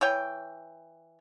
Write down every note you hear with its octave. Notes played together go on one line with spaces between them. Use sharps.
E3 C#5 G5